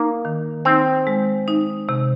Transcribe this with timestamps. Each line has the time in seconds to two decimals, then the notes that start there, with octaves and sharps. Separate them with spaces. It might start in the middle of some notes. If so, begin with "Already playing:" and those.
Already playing: A#3 D#4
0.25 D#3
0.65 C4 D#4
1.07 G#3
1.48 D#4
1.89 C3